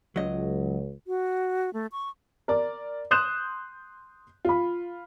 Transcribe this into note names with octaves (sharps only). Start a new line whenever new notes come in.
C#2 F#3 D#5
F#4
A3
C#6
A#4 D5
C6 D#6 F#6 G6 E7
F4 B5